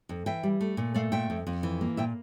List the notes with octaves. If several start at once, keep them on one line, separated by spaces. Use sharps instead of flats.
F2
E3 E5 G5
G3
A3
A#2
A3 D5 F5
A#2 E5 G5
F2
F2
E3
A#3
A#2 E5 G5